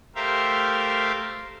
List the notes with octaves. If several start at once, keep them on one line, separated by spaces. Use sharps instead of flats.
A3 G4 A#4 C5 E5 F5